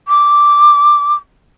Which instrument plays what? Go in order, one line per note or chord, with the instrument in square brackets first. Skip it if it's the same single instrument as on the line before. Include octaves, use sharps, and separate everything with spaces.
[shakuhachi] D6